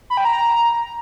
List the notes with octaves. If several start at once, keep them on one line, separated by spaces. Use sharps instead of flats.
B5
G5
A#5